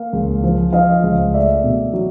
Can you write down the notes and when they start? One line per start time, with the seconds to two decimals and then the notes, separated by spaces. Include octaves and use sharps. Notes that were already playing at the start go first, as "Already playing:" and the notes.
Already playing: A#3 F5
0.13 C#2
0.43 F3
0.73 F3 D#5 F5
1.03 C#2
1.34 A3 D5 E5
1.64 B2
1.93 F#3